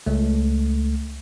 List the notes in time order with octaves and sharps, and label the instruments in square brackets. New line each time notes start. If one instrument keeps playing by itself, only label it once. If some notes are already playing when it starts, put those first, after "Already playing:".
[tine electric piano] C#2 A3